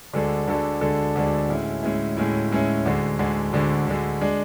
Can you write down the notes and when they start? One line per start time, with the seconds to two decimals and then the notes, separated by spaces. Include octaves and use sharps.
0.13 D2 D3 G#3 D4 A4
0.47 D2 D3 G#3 D4 A4
0.81 D2 D3 G#3 D4 A4
1.15 D2 D3 G#3 D4 A4
1.49 A2 G#3 C#4 E4
1.83 A2 G#3 C#4 E4
2.17 A2 G#3 C#4 E4
2.51 A2 G#3 C#4 E4
2.85 D2 D3 G#3
3.19 D2 D3 G#3
3.53 D2 D3 G#3
3.86 D2 D3 G#3
4.21 G#3 D4